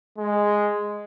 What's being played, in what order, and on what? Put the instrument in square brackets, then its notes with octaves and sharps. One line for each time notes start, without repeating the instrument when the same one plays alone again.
[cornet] G#3